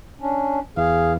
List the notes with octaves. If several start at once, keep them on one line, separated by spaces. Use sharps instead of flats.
C#4 D4
E2 G#4 F5